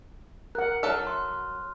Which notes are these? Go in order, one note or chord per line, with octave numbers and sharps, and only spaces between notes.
A#4 F#5 F#6
F#3 A4 E5 F6
C6